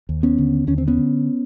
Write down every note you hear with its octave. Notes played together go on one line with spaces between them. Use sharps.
D#2
B3 C#4
D3
D#2 C#4
C4
B3 C#4
D3